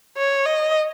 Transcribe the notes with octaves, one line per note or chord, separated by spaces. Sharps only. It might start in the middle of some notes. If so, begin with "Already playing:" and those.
C#5
D#5